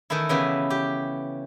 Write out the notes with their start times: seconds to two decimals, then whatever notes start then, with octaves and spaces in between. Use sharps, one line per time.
0.10 D#3 E3 A3 E4
0.29 C#3 E3 B3 F#4 G4
0.70 G4